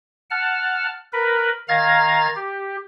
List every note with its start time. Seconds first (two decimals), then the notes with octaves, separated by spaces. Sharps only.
0.31 F#5 A5 F6
1.13 A#4 B4 B5
1.69 D#3 F5 A#5 F6 G#6 A6
2.36 G4